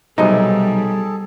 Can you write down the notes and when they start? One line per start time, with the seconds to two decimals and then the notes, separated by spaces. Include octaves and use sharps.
0.18 B1 C3 F#3 G3 D#4 G#4 A4 D#5